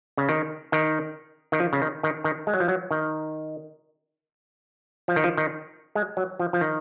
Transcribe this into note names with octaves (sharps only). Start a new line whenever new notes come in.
C#3
D#3
D#3
D#3
F3
C#3
D#3
D#3
D#3
G#3
F#3
F3
F#3
D#3
F3
D#3
F3
D#3
G#3
F#3
F3
F3
D#3